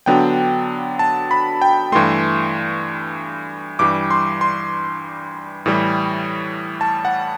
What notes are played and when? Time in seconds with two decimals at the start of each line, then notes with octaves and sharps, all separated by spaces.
0.06 D3 F#3 B3 D4 G5
0.99 A5
1.31 B5
1.62 G5
1.92 G2 E3 A3 C6
3.79 G2 E3 G3 D6
4.11 C6
4.41 C6
5.66 A2 E3 G3
6.81 A5
7.05 F#5